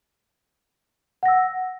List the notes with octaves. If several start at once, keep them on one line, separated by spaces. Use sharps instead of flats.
F#5 E6 A#6